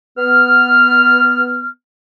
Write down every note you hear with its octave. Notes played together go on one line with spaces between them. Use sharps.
B3 F6